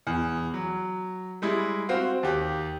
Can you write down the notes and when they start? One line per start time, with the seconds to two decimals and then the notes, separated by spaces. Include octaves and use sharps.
0.07 E2
0.54 F#3
1.42 G3 G#3 E4
1.89 C4 F#4 F5
2.23 D#2 G4